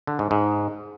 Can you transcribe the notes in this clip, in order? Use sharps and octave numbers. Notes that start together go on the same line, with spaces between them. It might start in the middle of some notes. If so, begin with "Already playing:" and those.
D3
G#2
G#2